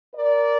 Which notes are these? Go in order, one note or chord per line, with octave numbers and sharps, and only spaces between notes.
A#4 D5